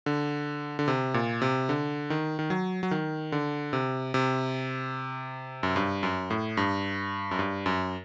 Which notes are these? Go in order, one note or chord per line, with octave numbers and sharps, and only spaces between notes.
D3
D3
C3
A#2
C3
D3
D#3
D#3
F#3
F#3
D#3
D3
C3
C3
F#2
G2
F#2
A2
G2
F#2
G2
F#2